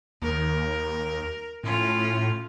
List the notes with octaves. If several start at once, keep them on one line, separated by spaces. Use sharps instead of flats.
D#2 A#4
A2 C#4 F4